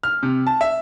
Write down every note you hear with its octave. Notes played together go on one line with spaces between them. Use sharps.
F6
C3
A5
E5